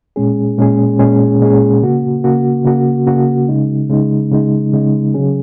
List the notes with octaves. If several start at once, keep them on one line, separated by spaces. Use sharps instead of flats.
A#2 G#3 C#4 G#4
A#2 G#3 C#4 G#4
A#2 G#3 C#4 G#4
A#2 G#3 C#4 G#4
C#3 A#3 F#4
C#3 A#3 F#4
C#3 A#3 F#4
C#3 A#3 F#4
C#3 G#3 D#4
C#3 G#3 D#4
C#3 G#3 D#4
C#3 G#3 D#4
C#3 F#3 C#4 G#4